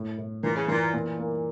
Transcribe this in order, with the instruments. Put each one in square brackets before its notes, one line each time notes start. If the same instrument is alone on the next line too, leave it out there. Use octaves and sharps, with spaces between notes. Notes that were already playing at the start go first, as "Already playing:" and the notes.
Already playing: [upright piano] A2
A2
[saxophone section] A#2 [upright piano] E3
[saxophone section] C#3
[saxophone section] A#2 [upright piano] E3
[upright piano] A#2
A#3